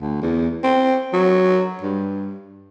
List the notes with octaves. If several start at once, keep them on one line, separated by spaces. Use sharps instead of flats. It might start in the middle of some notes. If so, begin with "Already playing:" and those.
D2
E2
C4
F#3
G2